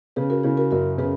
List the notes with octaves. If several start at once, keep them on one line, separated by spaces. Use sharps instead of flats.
C#3 G#4 B4
F#4 A#4
C#3 E4 G#4
F#4 A#4
F#2 F#4 A#4
C#3 G#4 B4